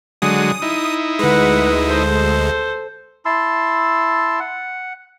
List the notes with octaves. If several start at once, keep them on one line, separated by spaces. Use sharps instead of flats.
D3 F#3 G#3 D#6
D#4 E4
D2 G#3 B4 F#5
A4 C5
E4 A5 C6 E6
F#5